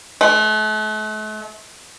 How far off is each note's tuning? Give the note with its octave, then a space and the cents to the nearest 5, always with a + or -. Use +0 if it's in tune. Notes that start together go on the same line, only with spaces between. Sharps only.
A3 -40